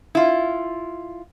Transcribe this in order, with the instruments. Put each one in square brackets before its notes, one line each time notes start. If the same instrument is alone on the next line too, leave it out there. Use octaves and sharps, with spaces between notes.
[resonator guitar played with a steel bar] E4 F4